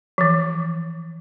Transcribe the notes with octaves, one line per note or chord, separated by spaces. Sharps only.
E3 F3